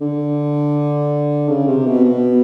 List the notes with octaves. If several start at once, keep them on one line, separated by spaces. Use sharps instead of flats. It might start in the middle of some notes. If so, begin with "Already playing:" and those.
D3
C#3
C3
B2
B2